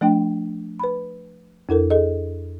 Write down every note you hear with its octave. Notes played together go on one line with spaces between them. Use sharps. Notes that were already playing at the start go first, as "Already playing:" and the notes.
F3 A3 D4 G5
B4 B5
F2 E4 A4 A#4
G#4 A4 D#5